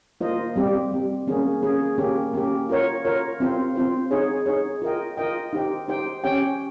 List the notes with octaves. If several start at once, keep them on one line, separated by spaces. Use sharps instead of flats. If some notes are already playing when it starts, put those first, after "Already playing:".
A#3 F4 C5 D#5
G3 C4 G4
G3 C4 G4
A#3 C#4 G#4
A#3 C#4 G#4
A#3 C#4 G4
A#3 C#4 G4
F4 A#4 C#5
F4 A#4 C#5
C4 F4 C5
C4 F4 C5
D#4 G#4 C#5
D#4 G#4 C#5
F4 A#4 D#5 G5
F4 A#4 D#5 G5
D#4 G4 C5 G5
D#4 G4 C5 G5
C#4 G4 C#5 G5